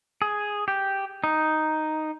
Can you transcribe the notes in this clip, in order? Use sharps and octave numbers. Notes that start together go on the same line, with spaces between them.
G#4
G4
D#4